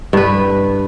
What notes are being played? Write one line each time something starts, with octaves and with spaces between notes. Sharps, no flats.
G2 B4